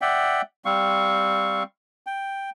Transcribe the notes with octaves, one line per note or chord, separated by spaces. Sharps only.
D5 E5 F#5 G5
G3 C4 F5 C#6
G5